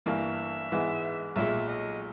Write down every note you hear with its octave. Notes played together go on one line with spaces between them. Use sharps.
G1 G2 E3 A#3 E5
G#2 E3 G#3 B3
B1 A#2 G#3 E5
D#5